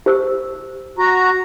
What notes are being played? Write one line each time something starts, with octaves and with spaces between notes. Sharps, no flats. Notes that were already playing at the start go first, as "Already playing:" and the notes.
G4 C5 E6
F#4 A#5